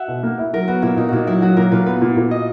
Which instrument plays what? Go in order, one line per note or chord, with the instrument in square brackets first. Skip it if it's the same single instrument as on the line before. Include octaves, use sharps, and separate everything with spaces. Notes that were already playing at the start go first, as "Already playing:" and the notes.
Already playing: [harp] F#4 E5 F#5
[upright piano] B2
A#3
E4
[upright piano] F#3 [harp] A#4
[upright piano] B3 [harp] F#4
[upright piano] A#2 [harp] E4
[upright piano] A#2 [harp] D#4
[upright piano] A#2 [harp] E4 F#4
[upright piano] F#3 [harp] E4
[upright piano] F#3 [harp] F#4
[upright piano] A#2 [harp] A#4
[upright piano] A#2 [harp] B4
[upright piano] B3 [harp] B4
[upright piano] A#2
A#2
[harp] D#5